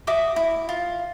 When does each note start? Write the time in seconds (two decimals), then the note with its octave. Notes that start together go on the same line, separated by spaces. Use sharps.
0.07 F#4 E5 D6 D#6
0.36 E4
0.69 F4